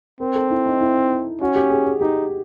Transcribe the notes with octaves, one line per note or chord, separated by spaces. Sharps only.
C4 A#4
A4
E4
D#4
E4
C#4 F#4
G4
G#4
G#4
D#4 G4